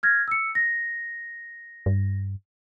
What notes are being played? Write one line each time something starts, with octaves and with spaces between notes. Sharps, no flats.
F6 G#6 A#6
E6 C#7
A#6
G2